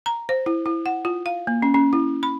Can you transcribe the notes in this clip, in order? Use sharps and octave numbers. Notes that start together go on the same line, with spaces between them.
A#5
C5
E4
E4
F#5
F4
F5
A#3
C#4
C#4
E4
B5